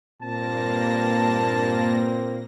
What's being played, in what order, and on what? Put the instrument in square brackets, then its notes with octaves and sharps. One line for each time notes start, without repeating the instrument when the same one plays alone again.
[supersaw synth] G2 A#3 A#6 [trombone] A#2 [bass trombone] C4 [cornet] A5